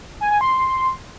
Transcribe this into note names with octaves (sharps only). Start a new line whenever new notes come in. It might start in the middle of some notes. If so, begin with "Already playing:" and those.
G#5
G#5
C6